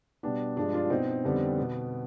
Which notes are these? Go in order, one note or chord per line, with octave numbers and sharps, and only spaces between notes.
B2 G3 B3 D4
G2 F3 G#3 D4
D4 F4
F4
B2 B3 C4 D#4
F2 D3 G3 B3
B2 B3